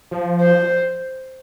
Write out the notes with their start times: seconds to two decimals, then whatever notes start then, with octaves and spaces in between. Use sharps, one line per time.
0.11 F3
0.41 C5